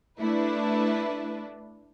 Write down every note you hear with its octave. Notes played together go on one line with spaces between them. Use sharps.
A3 D4 E4 B4